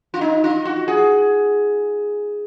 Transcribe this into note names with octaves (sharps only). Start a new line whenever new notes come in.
F4
D#4
F4
F#4
G#4